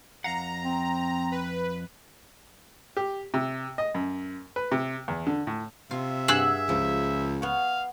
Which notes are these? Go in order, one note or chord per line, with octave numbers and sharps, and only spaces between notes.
F2 F5 F#5 A#5
C4
B4
G4
C3
D#5
F#2
B4
C3
E2
D3
A2
C3 F4 E5
G2 G#4 F#5 E6 F#6
C#2 F3
B3 C#5 F5